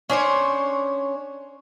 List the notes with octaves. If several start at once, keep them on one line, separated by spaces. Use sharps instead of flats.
C#4 D4 C5 C#5